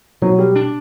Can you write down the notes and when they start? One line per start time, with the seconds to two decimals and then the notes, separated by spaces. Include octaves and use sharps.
0.22 B2 F#3
0.39 G3
0.56 D4